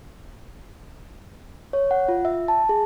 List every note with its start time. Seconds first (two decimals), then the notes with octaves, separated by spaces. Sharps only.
1.73 C#5
1.91 F#5
2.08 F4
2.25 E5
2.48 A5
2.69 G#4